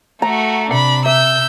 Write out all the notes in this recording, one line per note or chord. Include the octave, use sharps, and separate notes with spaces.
A3 F#4 A#5
C3 D4 B5
E5 E6 G6